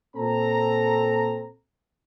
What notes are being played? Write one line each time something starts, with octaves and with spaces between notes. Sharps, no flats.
A#2 C4 A4 A#5